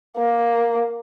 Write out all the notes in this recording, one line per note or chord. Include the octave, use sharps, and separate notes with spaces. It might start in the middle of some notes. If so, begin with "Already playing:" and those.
A#3